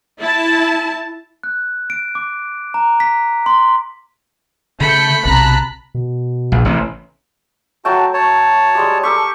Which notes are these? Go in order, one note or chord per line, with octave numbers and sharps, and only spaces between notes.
E4 A5
F#6
D7
D6
A#5
B6
C6
C#3 A3 B5 G6 C#7
B1 C3 A5 A#5 F#6
B2
A#1
A1 C3
F#3 A3 F#4 G5 A5
C#5 A5
G3 G#3 G4
G4 A4 A#4 C#6